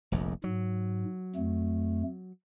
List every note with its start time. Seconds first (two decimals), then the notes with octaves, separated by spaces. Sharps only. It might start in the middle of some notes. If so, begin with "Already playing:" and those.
0.12 F1 A#1 F2
0.44 G#2 F#3
1.36 F2 A3